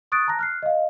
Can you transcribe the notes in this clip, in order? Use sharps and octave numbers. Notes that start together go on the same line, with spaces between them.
C#6 D#6 F#6 A6 D7
A5 A#5 F#6 A#6
F6 F#6 C7
D#5 F5